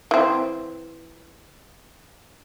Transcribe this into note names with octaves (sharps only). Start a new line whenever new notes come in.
E3 C4